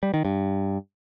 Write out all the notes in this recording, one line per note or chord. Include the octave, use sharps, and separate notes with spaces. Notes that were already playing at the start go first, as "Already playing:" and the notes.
G3
D#3
G2